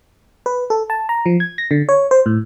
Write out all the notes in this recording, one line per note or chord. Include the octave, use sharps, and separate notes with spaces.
B4
A4
A5
A#5
F3
G#6
A#6
D3
C#5
C5
A2